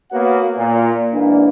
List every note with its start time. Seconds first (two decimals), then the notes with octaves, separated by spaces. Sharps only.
0.12 A#3 B3 F#4 C#5 F5 F#5
0.57 A#2
1.13 G#2 E3 A#3 D4